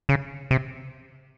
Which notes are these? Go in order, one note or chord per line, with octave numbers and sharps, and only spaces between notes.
C#3
C3